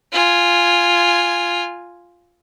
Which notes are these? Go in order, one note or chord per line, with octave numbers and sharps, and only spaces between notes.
F4 G#5